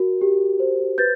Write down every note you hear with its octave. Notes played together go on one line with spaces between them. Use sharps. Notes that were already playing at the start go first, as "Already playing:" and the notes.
Already playing: F#4 A#4
G4
C5
B4 G6 A6